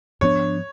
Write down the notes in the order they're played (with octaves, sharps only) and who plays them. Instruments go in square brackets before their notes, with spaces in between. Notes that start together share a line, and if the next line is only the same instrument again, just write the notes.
[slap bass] G#2 F3 B3 D4 [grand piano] C#5